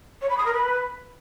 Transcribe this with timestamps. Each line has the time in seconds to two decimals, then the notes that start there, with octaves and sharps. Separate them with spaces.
0.21 C#5
0.30 B5
0.38 D#6
0.46 A#4
0.54 B4